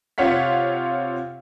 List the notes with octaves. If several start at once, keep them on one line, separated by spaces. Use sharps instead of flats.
C3 F4 C#5 F5 F#5 B6